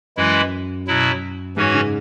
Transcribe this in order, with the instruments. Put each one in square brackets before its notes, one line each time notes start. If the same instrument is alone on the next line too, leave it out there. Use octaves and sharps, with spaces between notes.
[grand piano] F#2 [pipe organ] E3 G#3 E4
[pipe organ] B2 F#3 E4
[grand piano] G#2 [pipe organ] E3 C#4 F#4 C#5
[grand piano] C#3